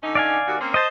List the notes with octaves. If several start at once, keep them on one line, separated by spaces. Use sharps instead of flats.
D3 C#4 D#4
D5 F5 G#5
D#2 F#4
A#3 C4 C#4
C5 D#5 A5